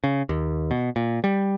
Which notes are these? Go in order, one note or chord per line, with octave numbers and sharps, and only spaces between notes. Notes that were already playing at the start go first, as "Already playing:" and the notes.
C#3
D#2
B2
A#2
G3